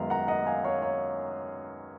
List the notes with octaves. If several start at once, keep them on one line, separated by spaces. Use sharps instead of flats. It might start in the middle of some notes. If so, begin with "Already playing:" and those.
Already playing: F#2 D#3 G#3 B3 F5
F#5 A#5
D#5 F#5
F5 G#5
C#5 F5
C#5